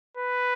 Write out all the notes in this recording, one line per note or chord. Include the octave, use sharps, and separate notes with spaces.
B4